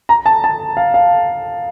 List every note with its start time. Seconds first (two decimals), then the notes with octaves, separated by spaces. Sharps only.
0.09 A#5
0.26 A5
0.44 A5
0.77 F5
0.94 F5